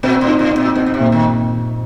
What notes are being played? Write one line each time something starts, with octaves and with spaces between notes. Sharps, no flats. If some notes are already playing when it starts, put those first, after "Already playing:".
A#2 C4
A2
D#4
A2
C4
A#2
B2 C4
B2
C3
A#2
D#3